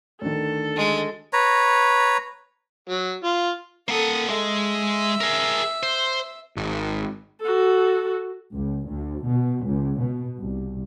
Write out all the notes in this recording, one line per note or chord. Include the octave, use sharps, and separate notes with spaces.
D2 D3 D#3 A4
G#3
B4 C#5 A#5
F#3
F4
A#3 A4 F#5 D#6
G#3 E5
G#4 A#4
C5
G#1
F#4 A4
C#2
D2
B2
C#2
B2
C2